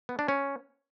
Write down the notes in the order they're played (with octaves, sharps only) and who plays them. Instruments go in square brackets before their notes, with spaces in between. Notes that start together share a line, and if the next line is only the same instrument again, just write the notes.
[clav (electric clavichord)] B3
D4
C#4